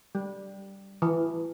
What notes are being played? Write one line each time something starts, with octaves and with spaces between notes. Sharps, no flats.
G3
E3